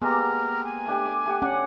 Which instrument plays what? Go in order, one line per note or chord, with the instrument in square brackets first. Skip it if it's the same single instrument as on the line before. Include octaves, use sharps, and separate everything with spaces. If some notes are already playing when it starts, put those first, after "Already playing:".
[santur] G#3 A#3 G4 [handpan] B3 [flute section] A#5 F6
[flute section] G#5
[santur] A3 D4 G4
D6
A3 G4 F#5
[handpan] C#4 F#5 [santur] D4